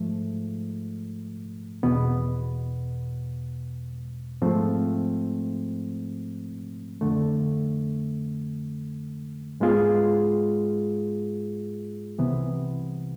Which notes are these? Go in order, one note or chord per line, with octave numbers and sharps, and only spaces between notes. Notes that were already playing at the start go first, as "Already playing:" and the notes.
Already playing: G#2 F3 A3
E2 B2 B3
G#2 F3 A3 C4
F2 D3 A3
G#2 G#3 B3 F4 G#4
C2 C3 E3 B3